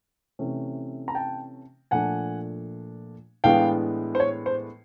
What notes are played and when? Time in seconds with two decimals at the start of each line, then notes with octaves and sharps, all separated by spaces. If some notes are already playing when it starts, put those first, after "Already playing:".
0.39 C3 E3 A3 C#4
1.08 A#5
1.15 G5 A5
1.91 A#2 F3 A3 D4 F#5 G#5
3.44 A2 E3 G#3 B3 D4 F5 G5
4.15 C5
4.20 C#5
4.46 C5